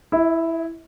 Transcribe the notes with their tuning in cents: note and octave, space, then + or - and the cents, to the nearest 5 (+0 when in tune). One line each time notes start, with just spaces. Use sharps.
E4 +0 E5 -45